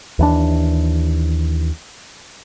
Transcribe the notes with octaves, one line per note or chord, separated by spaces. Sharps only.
D#2 E3 D4